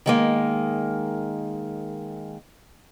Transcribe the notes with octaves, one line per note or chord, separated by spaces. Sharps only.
D#3 G#3 A#3